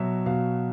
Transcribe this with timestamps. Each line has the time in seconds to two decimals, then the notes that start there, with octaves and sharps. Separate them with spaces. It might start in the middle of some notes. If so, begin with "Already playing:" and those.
Already playing: B2 F#3 E5
0.26 B2 F5